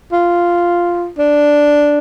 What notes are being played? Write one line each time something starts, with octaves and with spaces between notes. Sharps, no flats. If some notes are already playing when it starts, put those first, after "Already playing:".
F4
D4